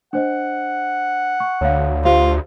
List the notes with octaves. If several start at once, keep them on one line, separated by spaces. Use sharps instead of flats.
D4 C5 D#5 F#5
C#6
D2 C#5 F5
F4 G4 C5 F5